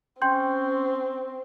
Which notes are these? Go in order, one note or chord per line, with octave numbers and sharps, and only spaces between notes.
C4 C#4 G5 C6 G6